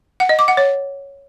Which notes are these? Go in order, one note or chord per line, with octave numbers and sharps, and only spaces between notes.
F#5
D#5
D6
F#5
C#5